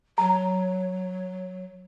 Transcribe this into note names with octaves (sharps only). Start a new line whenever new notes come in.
F#3 A#5